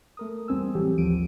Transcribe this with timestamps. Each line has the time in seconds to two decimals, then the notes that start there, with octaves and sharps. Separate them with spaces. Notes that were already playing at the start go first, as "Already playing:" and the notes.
0.17 A3 A#4 D#6
0.48 E2 G3 C4 G#5 E6
0.75 A1 E3 F#3 G4 A4
0.98 A1 D#2 F3 D7 D#7